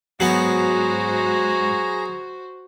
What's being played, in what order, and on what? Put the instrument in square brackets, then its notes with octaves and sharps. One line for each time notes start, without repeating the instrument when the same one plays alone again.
[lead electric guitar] E2 G#2 [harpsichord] F#3 B3 [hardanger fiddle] F#4 C5 [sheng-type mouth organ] G#4 A#5